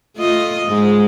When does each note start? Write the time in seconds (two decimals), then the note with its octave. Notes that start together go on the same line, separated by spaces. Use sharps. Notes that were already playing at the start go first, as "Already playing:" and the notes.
0.16 A3 F4 D#5
0.68 G#2 G#3